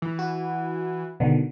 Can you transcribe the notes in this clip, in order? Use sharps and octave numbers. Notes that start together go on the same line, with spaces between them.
E3
F#4
B2 D3 D#3